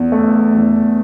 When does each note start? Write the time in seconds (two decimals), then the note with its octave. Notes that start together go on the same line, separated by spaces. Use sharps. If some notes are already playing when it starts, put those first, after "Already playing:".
Already playing: E2
0.12 A3
0.54 E2